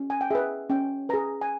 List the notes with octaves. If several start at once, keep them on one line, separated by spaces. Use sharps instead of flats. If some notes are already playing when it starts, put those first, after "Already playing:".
Already playing: C#4
G#5
G5
G#4 B4 E5
C#4 G5
G#4 B4 A#5
G#5